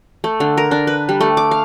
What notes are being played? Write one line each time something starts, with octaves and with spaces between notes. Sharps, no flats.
A3
D3
A#4
D4
B4
G3
A3
D6
F5